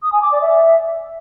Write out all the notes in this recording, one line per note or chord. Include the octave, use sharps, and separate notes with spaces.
D#6
G#5
D6
D5
E5